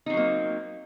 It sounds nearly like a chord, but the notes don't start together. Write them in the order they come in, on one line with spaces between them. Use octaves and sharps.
D#4 C4 F#3 A#3